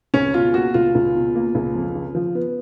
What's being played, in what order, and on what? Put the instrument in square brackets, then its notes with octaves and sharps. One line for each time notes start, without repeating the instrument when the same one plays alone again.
[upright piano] C#2 [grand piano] C#4
[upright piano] B2 [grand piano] F4
[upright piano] A#3 [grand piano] F#4
[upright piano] C#2 [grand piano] F4
[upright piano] C#2
B2
A#3
C#2
F2
C#3
F3
B3